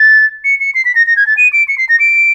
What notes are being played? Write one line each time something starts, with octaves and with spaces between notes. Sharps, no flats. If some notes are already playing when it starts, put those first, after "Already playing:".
Already playing: A6
C#7
C#7
C7
B6
A#6
A#6
G#6
A6
D#7
D7
C#7
C7
A#6
D7